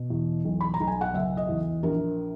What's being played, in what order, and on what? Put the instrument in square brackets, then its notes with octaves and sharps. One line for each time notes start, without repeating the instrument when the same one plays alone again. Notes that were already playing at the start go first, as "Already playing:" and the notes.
Already playing: [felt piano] B2
E2
B1
B5
A#5
B1
G#5
F#5
F#1 E5
D#5
E2
A#1 A#4